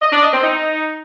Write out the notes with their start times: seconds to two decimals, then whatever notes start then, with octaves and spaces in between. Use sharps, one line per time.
0.02 D#5
0.12 D4
0.23 D#5
0.33 C4
0.43 D#4